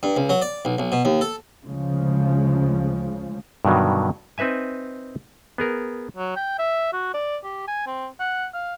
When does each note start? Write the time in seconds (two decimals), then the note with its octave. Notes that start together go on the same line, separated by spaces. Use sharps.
0.03 G2
0.16 C#2
0.29 F#3
0.42 D5
0.65 B1
0.78 B1
0.92 B2
1.05 D#2
1.21 A4
1.65 D2 C#3 F3 G#3
3.65 G2 B2 D3 D#3 F#3
4.38 C4 D#4 B4 E5 G#5
5.58 B3 G#4 A#4
6.17 F#3
6.36 G5
6.59 E5
6.93 F#4
7.14 D5
7.44 G4
7.68 G#5
7.87 C4
8.20 F#5
8.54 F5